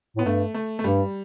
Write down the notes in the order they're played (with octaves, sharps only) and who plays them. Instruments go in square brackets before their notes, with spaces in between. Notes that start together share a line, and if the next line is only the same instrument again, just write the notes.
[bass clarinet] A2 [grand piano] B3
[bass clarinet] G2 [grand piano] A3
[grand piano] A3
A3
[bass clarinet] G2 [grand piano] G3